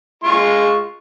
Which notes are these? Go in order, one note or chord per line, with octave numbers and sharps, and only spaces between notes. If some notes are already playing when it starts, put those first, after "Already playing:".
G#3 F4 C#6